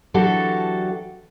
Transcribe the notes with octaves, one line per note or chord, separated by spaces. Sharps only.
E3 F#3 D4 F#4 G4 A4